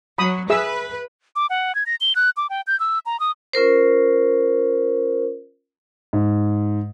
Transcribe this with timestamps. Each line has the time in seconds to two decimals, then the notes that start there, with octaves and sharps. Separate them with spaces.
0.18 F#3 B5 D#6
0.50 G#4 B4 E5 E6
1.36 D6
1.50 F#5
1.75 G#6
1.86 A#6
2.01 G7
2.16 F#6
2.37 D6
2.50 G5
2.67 G6
2.80 E6
3.06 A#5
3.20 D#6
3.53 C#4 F4 A#4 C5
6.13 G#2